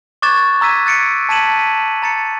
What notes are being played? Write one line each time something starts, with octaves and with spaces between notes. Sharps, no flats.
C#6 D6 F#6 G#6 A6 E7
A#5 E6 G#6 B6 D#7
F#6 A6 C#7 D7
A5 G#6 B6 D#7 E7 F#7
A#5 A6 C#7